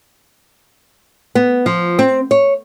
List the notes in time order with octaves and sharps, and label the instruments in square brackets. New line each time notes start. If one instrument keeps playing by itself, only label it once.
[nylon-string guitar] B3
F3
C4
C#5